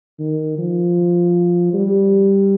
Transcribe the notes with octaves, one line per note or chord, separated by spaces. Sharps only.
D#3
F3
G3